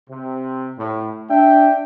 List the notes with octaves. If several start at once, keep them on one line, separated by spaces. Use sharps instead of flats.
C3
A2
D4 E5 G5